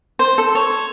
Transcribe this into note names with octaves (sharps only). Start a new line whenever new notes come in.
C5
A4
C#5